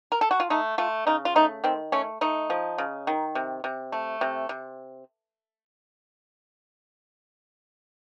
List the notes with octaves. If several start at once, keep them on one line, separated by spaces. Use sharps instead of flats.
A#4
A4
F#4
F4
A3 D#4
A3 F4
C#3 D#4
F4
A3 D#4
D#3 C4
A3 C#4
A3 D#4
F3
C#3
D#3
C3
C3
A3
C3
C3